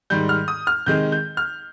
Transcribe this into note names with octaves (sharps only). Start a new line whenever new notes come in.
G#2 D#3 G3 G6
F6
D#6
F6
C3 D#3 G#3 G6
G6
F6